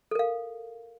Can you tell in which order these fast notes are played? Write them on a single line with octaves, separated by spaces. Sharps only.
A4 A#4 F5